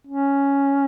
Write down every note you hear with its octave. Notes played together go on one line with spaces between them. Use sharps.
C#4